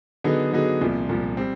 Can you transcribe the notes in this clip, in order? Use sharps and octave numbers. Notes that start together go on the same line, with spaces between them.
D3 F#3 B3 D#4 G#4
D3 F#3 B3 D#4 G#4
C2 A#2 F3
C2 A#2 F3
G3 C4